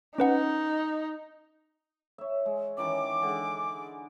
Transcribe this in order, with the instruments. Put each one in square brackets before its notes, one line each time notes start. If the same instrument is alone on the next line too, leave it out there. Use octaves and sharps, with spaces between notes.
[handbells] C#4 B4 F#5 [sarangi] D#4
[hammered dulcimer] C#5 E5
G#3
[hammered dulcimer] D#3 E3 C#4 [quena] D6
[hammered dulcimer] D3 G#3 G#4